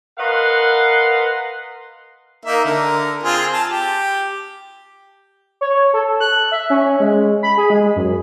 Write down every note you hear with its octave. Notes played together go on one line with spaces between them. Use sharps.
A#4 B4 D#5 F5 F#5 C6
A#3 D#4 E5
D3 A#4
C4 F4 G#4
A5
G4
C#5
A4
F#6
E5
C#4
G#3
B5
G#4
G#3
F#2